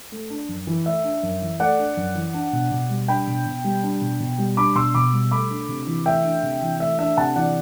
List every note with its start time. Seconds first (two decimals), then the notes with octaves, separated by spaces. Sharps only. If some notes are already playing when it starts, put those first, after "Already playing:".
0.12 A3
0.30 D4
0.49 F#2
0.67 E3
0.86 A3 E5
1.04 D4
1.23 F#2
1.42 E3
1.60 A3 D5 F#5
1.79 D4
1.97 F#2
2.15 E3
2.34 D4
2.53 B2
2.71 B2
2.90 G3
3.08 D4 G5 B5
3.27 B2
3.46 B2
3.64 G3
3.83 D4
4.01 B2
4.20 B2
4.38 G3
4.57 D4 B5 D6
4.75 B2 C6 E6
4.94 B2 B5 D6
5.13 G3
5.31 A3 B5 D6
5.50 D4
5.69 C3
5.87 E3
6.06 A3 E5 G5
6.24 D4
6.43 C3
6.62 E3
6.80 A3 E5
6.99 D4 E5
7.17 C3 F#5 A5
7.36 E3 D5 F#5